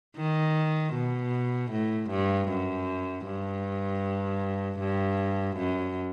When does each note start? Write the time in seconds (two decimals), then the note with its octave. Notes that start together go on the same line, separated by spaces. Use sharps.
0.17 D#3
0.94 B2
1.71 A2
2.10 G2
2.49 F#2
3.26 G2
4.80 G2
5.57 F#2